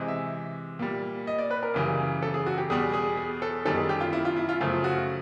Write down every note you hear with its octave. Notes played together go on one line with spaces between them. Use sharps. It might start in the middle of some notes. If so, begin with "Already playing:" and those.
Already playing: C3 E3 G#3
E5
A#2 G3
D#5
D5
B4
A#4
F#2 C#3 E3 G3
A4
G#4
F#4
G4
E2 B2 G3 G#4
G#4
G#4
A4
F#2 D#3 G3 A4
G#4
G4
F4
E4
F4
E4
F4
F#2 C#3 F3 A3 F4
F#4